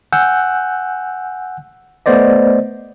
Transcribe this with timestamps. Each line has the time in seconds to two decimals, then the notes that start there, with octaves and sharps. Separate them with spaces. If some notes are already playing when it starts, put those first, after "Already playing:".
0.13 F#5 G#5 E6 F#6 G6
2.06 A3 B3 C5 D5 D#5